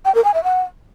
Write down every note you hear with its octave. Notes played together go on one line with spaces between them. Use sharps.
G5
A#4
G#5
E5
F#5